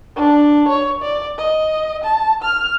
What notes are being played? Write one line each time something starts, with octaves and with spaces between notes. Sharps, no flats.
D4
C#5
D5
D#5
A5
F6